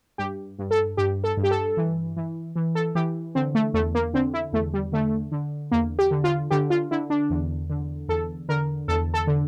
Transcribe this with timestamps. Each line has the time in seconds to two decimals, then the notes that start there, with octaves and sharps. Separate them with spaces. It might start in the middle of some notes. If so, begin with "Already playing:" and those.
0.18 G2 G4
0.59 G2
0.71 A4
0.97 G2 G4
1.24 A4
1.37 G2
1.44 G4
1.51 A4
1.77 E3
2.17 E3
2.56 E3
2.75 A4
2.95 E3 G4
3.35 D3 C4
3.55 A3
3.74 E2 A3
3.95 A#3
4.14 D3 C4
4.34 E4
4.53 E2 A3
4.74 G3
4.92 D3 A3
5.32 D3
5.71 E2 A#3
5.99 G4
6.11 D3
6.24 F4
6.51 D3 G4
6.70 F4
6.91 D3 E4
7.10 D4
7.30 E2
7.70 D3
8.09 E2 A4
8.49 D3 A#4
8.88 E2 A4
9.14 A4
9.27 D3